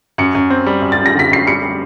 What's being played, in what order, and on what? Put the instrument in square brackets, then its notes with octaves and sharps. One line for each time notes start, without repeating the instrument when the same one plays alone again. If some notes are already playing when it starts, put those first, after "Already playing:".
[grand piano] F#2 [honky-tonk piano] C#7
[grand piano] F#2
C4
G3
F#2
[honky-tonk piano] A6
[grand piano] F#2
[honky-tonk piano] A#6
[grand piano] D3 [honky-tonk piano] B6
[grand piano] F#2 [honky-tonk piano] C7
[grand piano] G3 [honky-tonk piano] C#7
[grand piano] G3